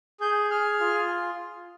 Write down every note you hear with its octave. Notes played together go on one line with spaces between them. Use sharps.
G#4 G6
G#4 F6
F4